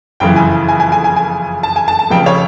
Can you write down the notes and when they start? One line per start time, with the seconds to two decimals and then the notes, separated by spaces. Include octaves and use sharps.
0.20 F#1 F2 C#3 E3 G5
0.36 G#5
0.69 G#5
0.80 G#5
0.92 G#5
1.04 G#5
1.16 G#5
1.63 A5
1.76 G#5
1.88 A5
1.99 A5
2.10 F1 F2 C#3 G5
2.26 C#5